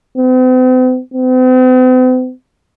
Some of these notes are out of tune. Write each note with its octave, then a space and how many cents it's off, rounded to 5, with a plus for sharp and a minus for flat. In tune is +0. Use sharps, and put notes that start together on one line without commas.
C4 -45
C4 -45